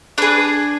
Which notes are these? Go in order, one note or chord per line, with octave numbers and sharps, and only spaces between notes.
D4 G#4 B4